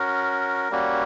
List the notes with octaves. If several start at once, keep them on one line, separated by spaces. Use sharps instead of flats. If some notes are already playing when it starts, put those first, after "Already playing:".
Already playing: C#4 F#4 A#4
G3 A#3 C#4 F#4